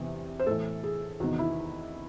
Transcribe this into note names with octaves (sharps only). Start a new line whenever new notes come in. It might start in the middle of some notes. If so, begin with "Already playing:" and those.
Already playing: E2 C3 E3
C5
A2 E3 A4
G#4
E2 C3 D#3 F#4
E4